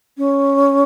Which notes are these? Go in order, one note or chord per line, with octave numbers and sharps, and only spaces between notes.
C#4